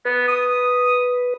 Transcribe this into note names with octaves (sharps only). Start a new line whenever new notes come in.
B3 B4
D#6